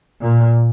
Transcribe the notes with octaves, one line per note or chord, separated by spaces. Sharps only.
A#2